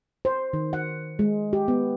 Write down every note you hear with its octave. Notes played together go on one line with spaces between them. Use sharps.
C5
D#3
F#5
G#3
G4
B3